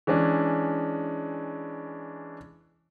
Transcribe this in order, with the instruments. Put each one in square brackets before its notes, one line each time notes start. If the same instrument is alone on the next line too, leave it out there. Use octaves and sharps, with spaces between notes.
[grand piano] E3 G#3 C#4 D4